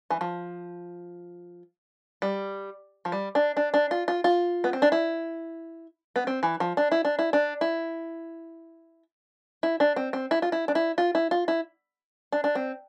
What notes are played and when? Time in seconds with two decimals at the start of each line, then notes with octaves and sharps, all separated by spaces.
0.10 E3
0.21 F3
2.22 G3
3.05 F3
3.12 G3
3.35 D4
3.57 D4
3.74 D4
3.91 F4
4.08 F4
4.24 F4
4.64 B3
4.73 C4
4.82 D4
4.92 E4
6.16 B3
6.27 C4
6.43 E3
6.60 F3
6.77 D4
6.92 E4
7.05 D4
7.19 E4
7.33 D4
7.61 E4
9.63 E4
9.80 D4
9.96 C4
10.13 C4
10.31 E4
10.42 F4
10.52 E4
10.68 D4
10.75 E4
10.98 F4
11.15 E4
11.31 F4
11.48 E4
12.32 D4
12.44 D4
12.55 C4